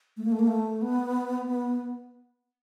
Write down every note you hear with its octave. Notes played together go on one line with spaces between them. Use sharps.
A3
A#3
A3
A#3
A3
B3
B3